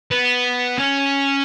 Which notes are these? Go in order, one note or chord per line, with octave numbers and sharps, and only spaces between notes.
B3
C#4